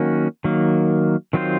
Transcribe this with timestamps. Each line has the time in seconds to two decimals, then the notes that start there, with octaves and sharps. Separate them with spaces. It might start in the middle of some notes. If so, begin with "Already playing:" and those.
Already playing: D#3 F#3 A#3 C#4 F#4
0.44 D#3 F#3 A#3
1.33 D#3 F#3 C4 F4 C5